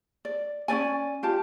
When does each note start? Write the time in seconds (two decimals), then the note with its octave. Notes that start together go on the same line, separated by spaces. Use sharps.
0.25 D5
0.68 C#4 D#4 D5 G#5
1.23 F4 G4 A5